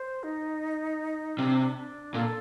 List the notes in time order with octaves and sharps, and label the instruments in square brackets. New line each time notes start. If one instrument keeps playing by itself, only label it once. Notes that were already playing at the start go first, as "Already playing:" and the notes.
Already playing: [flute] C5
D#4
[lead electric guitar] C3 [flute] D4
[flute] D4
[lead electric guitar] A#2 [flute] A4